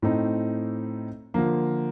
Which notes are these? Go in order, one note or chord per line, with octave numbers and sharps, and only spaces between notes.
A2 A3 C4 D#4
D3 F3 A#3